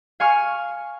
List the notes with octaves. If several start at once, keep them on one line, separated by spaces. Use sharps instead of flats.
F5 G#5 C#6 F6 C#7